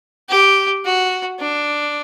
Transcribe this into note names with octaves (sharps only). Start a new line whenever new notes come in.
G4
F#4
D4